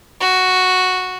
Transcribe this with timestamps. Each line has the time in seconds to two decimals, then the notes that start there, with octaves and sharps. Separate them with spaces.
0.20 F#4